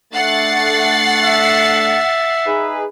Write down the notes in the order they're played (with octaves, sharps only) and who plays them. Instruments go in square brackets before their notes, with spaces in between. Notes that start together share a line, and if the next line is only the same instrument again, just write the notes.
[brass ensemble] A3 D4 [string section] F#5 A6 C7
[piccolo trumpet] E5
[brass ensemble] D#4 G#4 B4